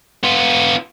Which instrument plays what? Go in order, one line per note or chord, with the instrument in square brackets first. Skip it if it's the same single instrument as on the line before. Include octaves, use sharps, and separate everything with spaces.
[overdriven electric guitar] B3 F4